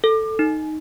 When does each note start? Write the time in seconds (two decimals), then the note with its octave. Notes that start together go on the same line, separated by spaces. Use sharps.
0.04 A4
0.39 D#4